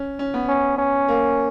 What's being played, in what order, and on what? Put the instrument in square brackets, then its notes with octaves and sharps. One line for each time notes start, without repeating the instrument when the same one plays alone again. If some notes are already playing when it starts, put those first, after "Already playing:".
Already playing: [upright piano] C#4
C#4
B3
[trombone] C#4
C#4
[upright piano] A#3